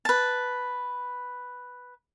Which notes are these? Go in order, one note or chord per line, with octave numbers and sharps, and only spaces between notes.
B4 A5